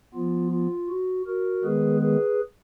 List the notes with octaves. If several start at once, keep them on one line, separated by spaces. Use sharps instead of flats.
F3 B3 F4
F4
F#4
F#4 A#4
D#3 G#3 B3 G#4 B4
G#4 B4